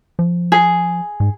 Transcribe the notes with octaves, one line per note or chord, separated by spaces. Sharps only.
F3
G#4
G#2